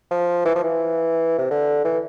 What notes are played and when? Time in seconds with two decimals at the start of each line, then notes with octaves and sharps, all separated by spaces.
0.11 F3
0.45 E3
0.55 F3
0.64 E3
1.38 C3
1.51 D3
1.84 E3